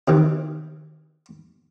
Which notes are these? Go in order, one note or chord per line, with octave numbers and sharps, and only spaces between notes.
C3 D#3 E3